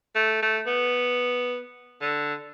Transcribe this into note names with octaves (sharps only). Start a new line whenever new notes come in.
A3
A3
B3
D3